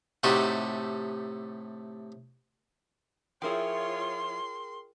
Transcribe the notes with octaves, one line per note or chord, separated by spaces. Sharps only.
A2 C3 A3 D#4 F#4 G4
F3 E4 F4 G#4 A#4 C#5 G5 C6